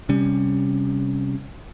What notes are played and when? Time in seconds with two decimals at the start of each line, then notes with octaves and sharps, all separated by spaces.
0.09 C3 G3 C#4